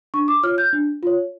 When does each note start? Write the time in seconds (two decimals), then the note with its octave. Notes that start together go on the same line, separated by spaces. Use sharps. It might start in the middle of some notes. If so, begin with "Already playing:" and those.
0.14 D4 C#6
0.28 D6
0.43 F4 C#5 F6
0.58 G6
0.73 D4
1.03 F4 C#5